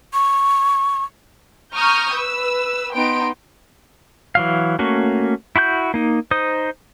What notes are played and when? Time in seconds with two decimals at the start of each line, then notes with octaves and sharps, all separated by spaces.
0.13 C#6
1.75 A#5 C#6 D#6 F6 G6
2.14 B4 E6
2.94 B3 D#4 G5 C6 D7
4.35 E3 F#3 F5
4.79 A3 A#3 C#4 F#4
5.56 E4 F#4 B5 G6
5.94 A#3 D#4
6.31 D#4 C5 D#6